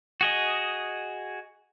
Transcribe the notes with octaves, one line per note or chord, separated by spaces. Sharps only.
F#4 G#4 D#5